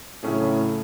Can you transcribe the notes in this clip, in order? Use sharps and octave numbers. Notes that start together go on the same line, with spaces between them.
A2 C#3 F#3 A3 C#4 G#4